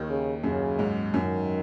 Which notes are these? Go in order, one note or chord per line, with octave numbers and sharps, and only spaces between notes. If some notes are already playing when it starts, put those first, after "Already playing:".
Already playing: D#2 D#3
C#3
F#2 C#3
G#2
F#2 D#3